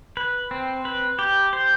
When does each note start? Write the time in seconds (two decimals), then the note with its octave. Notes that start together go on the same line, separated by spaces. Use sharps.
0.17 B4
0.51 C4
0.85 B4
1.19 G4
1.53 C5